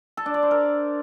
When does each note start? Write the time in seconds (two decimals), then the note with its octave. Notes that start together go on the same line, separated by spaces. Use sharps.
0.17 A4
0.26 D4
0.34 D5
0.43 C5
0.51 A#4